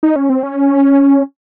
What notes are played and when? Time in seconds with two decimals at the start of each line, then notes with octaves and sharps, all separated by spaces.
0.03 D#4
0.16 C#4
0.29 C4
0.43 C#4